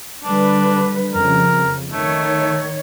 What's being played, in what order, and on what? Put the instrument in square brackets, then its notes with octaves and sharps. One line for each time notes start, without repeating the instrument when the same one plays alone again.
[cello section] D3 G3 B4 [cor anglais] D4
[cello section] F2 C#3 [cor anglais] A#4
[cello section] D#3 C#5 [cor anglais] A3